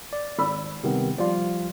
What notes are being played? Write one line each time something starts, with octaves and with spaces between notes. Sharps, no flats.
D5
G#1 B5 E6
C3 D#3 G3 B3
F3 G3 F4 D5